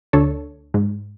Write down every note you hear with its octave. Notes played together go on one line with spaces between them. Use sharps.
D2 D4 A4 C#5
G#2